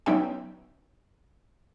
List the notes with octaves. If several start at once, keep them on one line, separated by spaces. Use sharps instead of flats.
F#3 B3 C#4 D#4 E5 G5